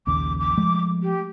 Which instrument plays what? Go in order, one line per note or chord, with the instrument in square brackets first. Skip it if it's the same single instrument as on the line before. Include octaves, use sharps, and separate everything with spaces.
[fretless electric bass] A#1 D#2 C#3 [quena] D6
[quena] D6
[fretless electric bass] F3 G#3 A3
[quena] G4